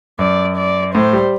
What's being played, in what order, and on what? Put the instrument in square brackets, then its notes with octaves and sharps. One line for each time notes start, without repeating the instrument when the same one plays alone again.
[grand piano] F#2 [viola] D5
[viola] D5
[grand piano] A2 [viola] C5
[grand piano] G3